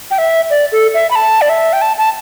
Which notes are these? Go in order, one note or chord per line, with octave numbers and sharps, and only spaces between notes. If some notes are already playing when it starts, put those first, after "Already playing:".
G5
E5
D5
A4
E5
B5
A5
D5
E5
G5
A5
A5